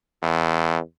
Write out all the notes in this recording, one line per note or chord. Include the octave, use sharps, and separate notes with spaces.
E2